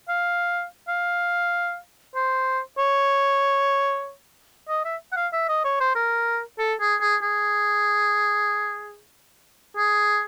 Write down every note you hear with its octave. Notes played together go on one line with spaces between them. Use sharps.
F5
F5
C5
C#5
D#5
E5
F#5
F5
E5
D#5
C#5
C5
A#4
A4
G#4
G#4
G#4
G#4